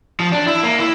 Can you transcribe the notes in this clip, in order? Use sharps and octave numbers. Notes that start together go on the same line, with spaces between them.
F3
D4
E4
A#3
E4